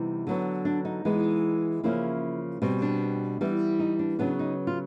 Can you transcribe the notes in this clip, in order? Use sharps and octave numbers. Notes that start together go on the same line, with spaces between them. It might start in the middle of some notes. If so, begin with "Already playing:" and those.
Already playing: C3 E3 G3 B3 D#4
D3 F#3 B3
D4
D#4
E3 G#3 B3
C#3 F3 A#3 C#4 E4
B2 G3 C4
D4
E3 G3 B3
D#4
D4
C#3 F#3 B3 D4
D#4
F4